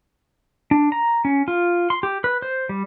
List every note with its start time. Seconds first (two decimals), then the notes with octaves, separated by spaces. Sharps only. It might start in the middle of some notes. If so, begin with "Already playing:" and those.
0.71 D4
0.92 A#5
1.25 C#4
1.48 F4
1.90 C6
2.03 G4
2.24 B4
2.42 C5
2.69 G3